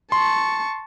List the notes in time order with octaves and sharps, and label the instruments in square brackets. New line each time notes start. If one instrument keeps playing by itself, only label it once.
[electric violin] A5 C#6 [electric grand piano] C6